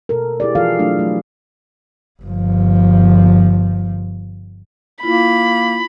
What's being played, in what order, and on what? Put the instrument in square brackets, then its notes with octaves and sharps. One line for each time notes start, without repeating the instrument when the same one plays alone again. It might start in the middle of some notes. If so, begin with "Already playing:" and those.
[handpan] B2 A4 A#4
E4 G4 G#4 D5
E3 F3 F4 G#4 A4 F5
F#3 A3 D4 E4
F#3 A3
[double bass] G1 F3
[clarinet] A#3 [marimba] E4 F4 [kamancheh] B5